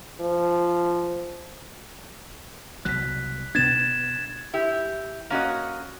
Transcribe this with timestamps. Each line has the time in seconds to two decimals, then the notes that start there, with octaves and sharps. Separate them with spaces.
0.21 F3
2.85 C2 B2 F#3 F#6 B6
3.55 B2 B3 D4 G#6 A6 E7
4.54 E4 G4
5.30 A#3 C#4 F#4 D#5